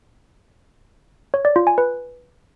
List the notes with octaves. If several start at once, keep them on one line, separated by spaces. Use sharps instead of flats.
C#5
D5
F4
G#5
B4